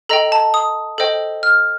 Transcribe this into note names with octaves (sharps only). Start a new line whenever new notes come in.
A4 D#5 G5 A#5
A5
D#6
A4 C5 D#5 G5
F6